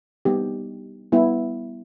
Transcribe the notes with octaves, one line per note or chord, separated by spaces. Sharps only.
G3 B3 D#4 G4
G3 B3 E4